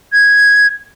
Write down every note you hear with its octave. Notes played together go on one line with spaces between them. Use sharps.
G#6